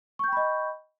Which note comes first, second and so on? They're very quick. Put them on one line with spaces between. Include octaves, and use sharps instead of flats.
C#6 G6 G5 B5 D#5